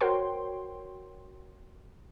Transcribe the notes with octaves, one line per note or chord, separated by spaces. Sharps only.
F#4 A#4 C5 C#5 G5 C6